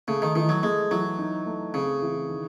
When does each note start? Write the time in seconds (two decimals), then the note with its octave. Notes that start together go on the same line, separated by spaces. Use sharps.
0.08 C#3 A3
0.22 D#3
0.35 D#3 E3
0.49 F#3
0.63 G#3 A3
0.91 E3 F#3
1.19 D#4
1.46 A3
1.74 C#3 C4
2.02 E3
2.30 D#3